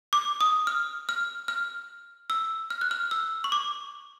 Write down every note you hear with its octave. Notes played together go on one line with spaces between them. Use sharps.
D6
D#6
F6
F6
F6
E6
F6
F#6
F6
E6
C#6
D6